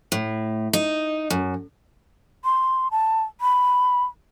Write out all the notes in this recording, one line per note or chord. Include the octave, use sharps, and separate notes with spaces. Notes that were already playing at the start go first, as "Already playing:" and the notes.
A2
D#4
F#2
C6
A5
B5